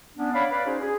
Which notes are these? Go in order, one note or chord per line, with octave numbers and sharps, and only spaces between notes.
B3 C#4 D4
C#5 D5 F5 B5
B4 D5 F5 B5
C#4 D#4 F#4 G#4 C5
G#4